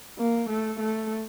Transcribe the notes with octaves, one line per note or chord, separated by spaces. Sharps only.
A#3
A3
A3